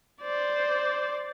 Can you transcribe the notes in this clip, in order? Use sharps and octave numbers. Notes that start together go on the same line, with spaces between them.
C5 D5